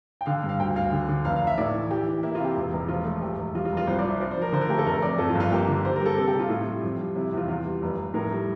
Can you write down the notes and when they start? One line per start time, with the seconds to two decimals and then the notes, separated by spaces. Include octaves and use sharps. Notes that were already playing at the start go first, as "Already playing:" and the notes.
0.21 G5
0.26 D3 F5
0.43 G2
0.49 F5
0.59 D2 G5
0.75 D2 F5
0.92 D3
1.09 D3
1.24 F1 F5
1.36 F5
1.41 F1
1.47 E5
1.58 A2 D5
1.74 E3
1.91 E3 G4
2.07 E3
2.23 A#3 E4
2.35 F4
2.40 C3 G4
2.56 E1
2.73 E1
2.88 F3 F4
3.05 A3
3.22 E1 G4
3.38 E1
3.55 G3 F4
3.65 F4
3.72 F1
3.77 F4
3.87 C2 C5
3.99 D5
4.05 F3 E5
4.20 F3 D5
4.31 C5
4.37 F3 A#4
4.53 D3 C5
4.61 A#4
4.69 A3 G4
4.78 A4
4.86 F1 A#4
5.02 F2 D5
5.18 F2 A4
5.30 F4
5.35 G1
5.40 F4
5.52 A#3 G4
5.68 D3
5.85 G3 C5
5.96 G3 A#4
6.06 A4
6.17 C3 A4
6.28 G4
6.34 C3
6.39 F4
6.50 A2 F4
6.67 G3
6.83 F2
7.00 G3
7.15 C3 E4
7.33 E2 F4
7.48 E2 F4
7.65 G3
7.82 F1
7.97 F1
8.14 A2 A#4
8.31 G3